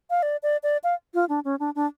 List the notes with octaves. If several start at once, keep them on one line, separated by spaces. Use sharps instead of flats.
F5
D5
D5
D5
F5
F4
D4
C#4
D4
D4